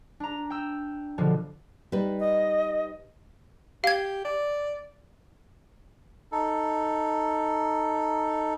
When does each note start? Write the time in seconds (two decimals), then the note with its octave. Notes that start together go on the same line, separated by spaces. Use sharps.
0.20 D4 A#5
0.50 G5 E6
1.18 B2 D3 F3
1.92 G3 D#4 B4
2.20 D#5
3.84 G4 F5 G#6
4.25 D5
6.32 D#4 A4